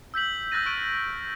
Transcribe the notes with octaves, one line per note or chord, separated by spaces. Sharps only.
E6 G6 B6 F#7
E6 F#6 G6 A6 A#6 D#7
C#6 F6 F#6 A6 D7 D#7